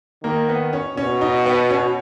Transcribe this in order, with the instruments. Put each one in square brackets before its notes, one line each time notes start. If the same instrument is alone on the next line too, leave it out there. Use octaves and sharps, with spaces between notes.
[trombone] D#3 [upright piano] A#3
[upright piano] B3
C#4
[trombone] B2 [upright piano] C#4
[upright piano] D#4
B3
C#4